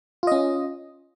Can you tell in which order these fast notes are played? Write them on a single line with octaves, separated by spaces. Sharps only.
F4 D#5 C#4